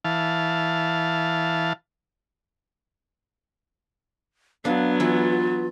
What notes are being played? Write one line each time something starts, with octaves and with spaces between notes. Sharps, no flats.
E3 F5 A5
F#3 B3 D4 F5
E3 E4 F4